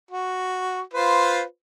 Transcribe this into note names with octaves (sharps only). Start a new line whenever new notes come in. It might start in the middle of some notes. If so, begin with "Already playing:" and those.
F#4
F4 B4 C5